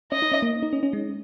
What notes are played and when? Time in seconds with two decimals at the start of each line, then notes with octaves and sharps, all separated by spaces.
0.12 C#4 D#5
0.22 D#4
0.32 C#4
0.42 A#3
0.63 D#4
0.73 C#4
0.83 C#4
0.93 G#3